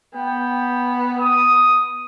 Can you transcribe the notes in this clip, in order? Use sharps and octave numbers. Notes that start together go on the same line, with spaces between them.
B3 G5
D#6